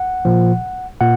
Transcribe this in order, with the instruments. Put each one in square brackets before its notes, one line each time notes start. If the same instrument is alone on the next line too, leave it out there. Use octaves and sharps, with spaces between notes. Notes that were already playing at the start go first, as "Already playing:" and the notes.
Already playing: [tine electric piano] F#5
A#2 F3
A#2 F#5